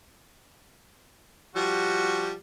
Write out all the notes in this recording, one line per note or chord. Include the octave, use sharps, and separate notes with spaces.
F3 G3 F#4